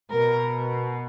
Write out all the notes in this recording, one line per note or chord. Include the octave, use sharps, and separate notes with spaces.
B2 A#4